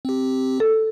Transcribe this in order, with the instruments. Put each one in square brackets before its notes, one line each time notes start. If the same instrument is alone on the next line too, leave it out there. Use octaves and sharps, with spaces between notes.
[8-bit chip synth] C4 G4
[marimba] A4